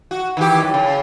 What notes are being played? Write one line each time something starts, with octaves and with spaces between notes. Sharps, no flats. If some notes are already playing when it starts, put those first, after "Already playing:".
F#4
D#3 E3 G4
F#2
C#3